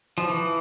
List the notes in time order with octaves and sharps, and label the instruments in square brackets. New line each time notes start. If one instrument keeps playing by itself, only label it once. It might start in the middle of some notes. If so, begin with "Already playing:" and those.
[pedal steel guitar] F3
E3